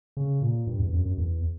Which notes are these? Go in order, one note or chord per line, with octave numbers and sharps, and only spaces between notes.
C#3
A#2
G2
E2
F#2
F#2
E2